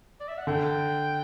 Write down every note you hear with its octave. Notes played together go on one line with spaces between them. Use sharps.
D5
E5
F#5
D3 G5